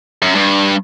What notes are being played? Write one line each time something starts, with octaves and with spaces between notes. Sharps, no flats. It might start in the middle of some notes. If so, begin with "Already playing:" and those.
F#2
G2